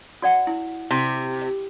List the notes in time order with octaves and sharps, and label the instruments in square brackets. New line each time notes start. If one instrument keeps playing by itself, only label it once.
[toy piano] F#4 D5 F#5
E4
[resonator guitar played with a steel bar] C3 [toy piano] E4